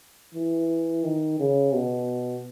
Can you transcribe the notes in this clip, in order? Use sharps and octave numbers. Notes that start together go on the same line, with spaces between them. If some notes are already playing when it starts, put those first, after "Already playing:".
E3
D#3
C#3
B2